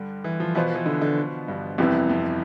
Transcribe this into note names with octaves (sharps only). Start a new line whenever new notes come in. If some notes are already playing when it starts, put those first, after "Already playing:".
Already playing: G2 D3 G3
E3
F3
B2 E3 B3 F4 C5
E3
D3
D3
G2
C2 F2 C3 E3 B3 E4
F2